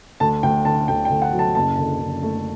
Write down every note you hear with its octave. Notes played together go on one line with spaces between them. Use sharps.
D2 A5
D2 G5
D3 A5
D2 G5
G5
D2
F#5
F#3
A5
F#1 A5
D3 A5
F#1
A3